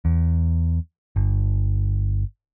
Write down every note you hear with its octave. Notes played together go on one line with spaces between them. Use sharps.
E2
G1